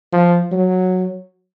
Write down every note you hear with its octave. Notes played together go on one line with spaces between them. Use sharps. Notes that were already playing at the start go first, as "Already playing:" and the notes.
F3
F#3